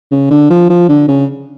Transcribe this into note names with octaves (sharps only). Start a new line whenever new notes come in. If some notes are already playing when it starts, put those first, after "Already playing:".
C#3
D3
F3
F3
D3
C#3